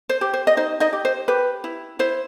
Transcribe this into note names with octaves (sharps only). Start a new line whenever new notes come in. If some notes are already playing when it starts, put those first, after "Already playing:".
C5
G4
C5
D#5
D#4 C5
D#4 D#5
G4
C5
G4 B4
E4
E4 C5